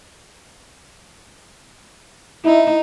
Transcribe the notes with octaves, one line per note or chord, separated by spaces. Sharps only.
D#4 E4